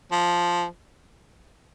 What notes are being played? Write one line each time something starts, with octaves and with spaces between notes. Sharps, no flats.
F3